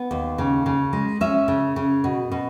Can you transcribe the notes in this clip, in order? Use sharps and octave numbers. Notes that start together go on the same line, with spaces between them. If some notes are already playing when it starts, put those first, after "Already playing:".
Already playing: B3
D#2
C#3
C#3
G#3
C#4 E5
C#3
C#3
B2
B2